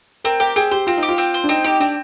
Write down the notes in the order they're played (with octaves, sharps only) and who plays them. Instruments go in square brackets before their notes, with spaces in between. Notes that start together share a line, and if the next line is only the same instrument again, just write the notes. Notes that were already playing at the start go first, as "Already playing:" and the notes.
[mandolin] C4 [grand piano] A#4
[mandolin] G4 [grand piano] A#4
[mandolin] C4 [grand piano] G#4
[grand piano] G4 [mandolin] C5
[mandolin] C4 [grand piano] F4
[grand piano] D#4
[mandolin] G4
[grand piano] F4
[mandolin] C4
C5
[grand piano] D4
[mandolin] C4 [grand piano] D#4
[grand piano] D#4 [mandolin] G4
[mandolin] C4 [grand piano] D4